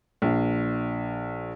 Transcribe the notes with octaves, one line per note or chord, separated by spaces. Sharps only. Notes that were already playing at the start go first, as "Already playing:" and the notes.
A#1